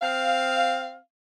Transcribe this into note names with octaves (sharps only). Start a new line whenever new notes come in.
C4 F5